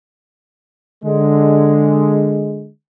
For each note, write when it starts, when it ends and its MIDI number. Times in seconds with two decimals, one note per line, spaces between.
1.04 2.68 50
1.04 2.68 56